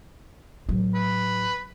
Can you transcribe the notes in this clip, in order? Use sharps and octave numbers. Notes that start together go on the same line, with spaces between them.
A2 F#3
B4